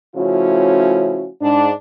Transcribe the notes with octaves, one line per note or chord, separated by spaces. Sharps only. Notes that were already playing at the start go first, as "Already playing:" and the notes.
C#3 F3 A3 C#4 E4 F#4
G#2 D4